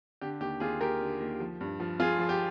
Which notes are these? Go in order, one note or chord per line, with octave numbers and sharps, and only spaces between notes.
D3 G4
D#2 G4
D#2 F4 G#4
D#2 G4 A#4
D3
D#2
F3
G2
F3
F3 F4 G#4
F3
G4